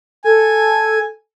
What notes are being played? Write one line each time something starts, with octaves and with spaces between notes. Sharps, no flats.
A4 G#5